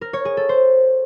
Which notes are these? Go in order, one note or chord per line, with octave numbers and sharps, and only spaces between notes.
A#4
C#5
G#4
A4
C5